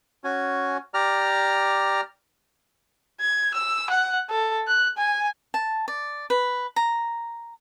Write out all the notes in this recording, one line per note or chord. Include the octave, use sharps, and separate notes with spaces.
C#4 F#4 G#5
G4 D5 A#5 F6
G#6
E6
F#5
A4
F#6
G#5
A5
D5
B4
A#5